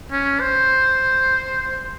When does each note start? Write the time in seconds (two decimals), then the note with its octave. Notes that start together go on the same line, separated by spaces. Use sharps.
0.12 C#4
0.40 C5